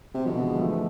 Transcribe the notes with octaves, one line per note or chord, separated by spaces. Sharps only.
C3
B2 D3 F3
E3 G#3
F3 A3